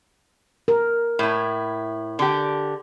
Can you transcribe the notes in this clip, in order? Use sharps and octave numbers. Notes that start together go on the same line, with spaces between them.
A#4
A2 E4
D3 G4